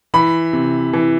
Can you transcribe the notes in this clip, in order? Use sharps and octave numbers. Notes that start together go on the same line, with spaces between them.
E3 B5
C3
E3